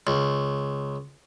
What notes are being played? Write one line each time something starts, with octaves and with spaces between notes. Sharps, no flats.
C#2